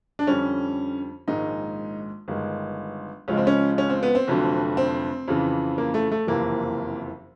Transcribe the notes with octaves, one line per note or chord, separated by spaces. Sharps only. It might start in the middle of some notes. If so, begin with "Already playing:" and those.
D4
F2 D3 G3 C#4
A#1 G#2 D#3 G#3 D#4
G1 G2 D#3 G#3
C#2 C#3 F3 G#3 C#4
C4
C#4
C#4
C4
B3
C4
F1 F2 D3 F#3
C4
F2 C#3 E3
A#3
A3
A3
F#1 F2 C3 E3 A#3